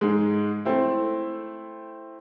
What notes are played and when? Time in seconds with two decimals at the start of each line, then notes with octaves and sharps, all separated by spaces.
0.01 G#2 G#3
0.65 A3 C4 E4